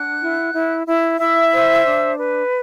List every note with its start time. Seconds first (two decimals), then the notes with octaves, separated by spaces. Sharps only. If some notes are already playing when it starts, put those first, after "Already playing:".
Already playing: D4 F#5 F#6
0.20 E4
0.53 E4
0.87 E4
1.19 E4 E5 E6
1.52 C5
1.85 D4
2.18 B4